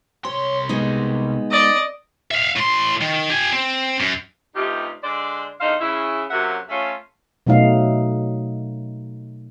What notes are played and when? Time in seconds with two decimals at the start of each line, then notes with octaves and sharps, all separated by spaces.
0.25 C2 C#5 C6
0.69 G#3 B3 D#4
1.51 D5 D#5
2.31 E5 F5
2.56 A2 C6
3.01 D#3
3.30 G4 G#5
3.52 C4
4.00 F#2
4.56 G2 C3 A3 D#4 F4 G4
5.04 D3 G#3 D4 C5 D5
5.61 E2 D3 D#4 C5 F5
5.81 C#3 E4
6.30 F#2 C3 F#3 A#3 E5 F#5
6.69 A3 C#4 F4
7.47 B2 F#3 A3 D#4 F5